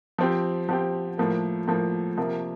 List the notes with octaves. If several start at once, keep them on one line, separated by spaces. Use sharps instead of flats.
F3 C4 G4
F3 C4 G4
A2 F3 A#3
A2 F3 A#3
C3 F3 A#3